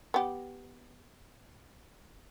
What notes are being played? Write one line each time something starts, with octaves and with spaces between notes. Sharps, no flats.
B3 G4